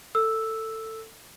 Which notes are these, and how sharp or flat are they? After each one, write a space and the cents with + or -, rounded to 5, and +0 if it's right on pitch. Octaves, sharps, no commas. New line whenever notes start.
A4 +15 E6 +0